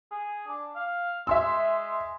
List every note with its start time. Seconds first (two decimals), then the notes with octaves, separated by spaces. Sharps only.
0.11 G#4
0.47 D4
0.76 F5
1.27 G#3 E5 C6 E6